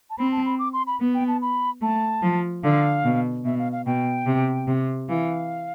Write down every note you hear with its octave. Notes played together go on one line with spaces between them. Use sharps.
A5
C4 B5
A5
B5
D6
C6
B5
B3
G5
A5
B5
A3 A5
F3
D3 F5
B2
B2 E5
F5
F5
B2 G5
C3
C3
E3 F5